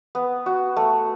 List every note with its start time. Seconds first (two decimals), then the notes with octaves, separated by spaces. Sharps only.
0.15 B3
0.46 F#4
0.76 A3